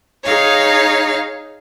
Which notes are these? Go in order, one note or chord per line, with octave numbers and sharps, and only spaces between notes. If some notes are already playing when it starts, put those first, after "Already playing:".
D#4 G#4 C#5 F5